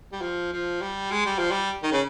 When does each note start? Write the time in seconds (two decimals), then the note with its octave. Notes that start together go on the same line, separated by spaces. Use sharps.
0.12 G3
0.21 F3
0.52 F3
0.82 G3
1.11 G#3
1.26 G3
1.38 F3
1.51 G3
1.83 D#3
1.92 C#3